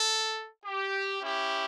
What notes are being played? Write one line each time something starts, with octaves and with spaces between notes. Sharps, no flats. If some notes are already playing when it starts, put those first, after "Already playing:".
Already playing: A4
G4
C#4 E4 G4